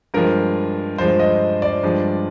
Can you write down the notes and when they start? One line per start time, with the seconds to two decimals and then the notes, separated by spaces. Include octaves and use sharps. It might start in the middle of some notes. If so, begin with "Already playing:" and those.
0.14 G2 F3 G#3 A#4
0.98 G2 F3 G#3 C5
1.20 D#5
1.62 D5
1.83 G2 F3 G#3